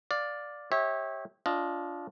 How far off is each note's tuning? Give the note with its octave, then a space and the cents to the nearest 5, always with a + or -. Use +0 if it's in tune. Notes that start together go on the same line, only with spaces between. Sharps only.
D5 +0 F5 +15
G4 +0 C#5 -30 E5 -25
D4 -20 F4 +0 D#5 +0